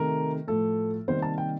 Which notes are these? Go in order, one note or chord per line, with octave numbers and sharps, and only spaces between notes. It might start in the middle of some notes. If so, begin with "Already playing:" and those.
Already playing: C3 D#3 A3 A#4
A2 F3 A3 A4
C3 D#3 G3 A#3 C5
A5
G5